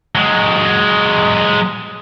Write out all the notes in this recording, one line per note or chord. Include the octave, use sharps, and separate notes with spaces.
F#3 G#3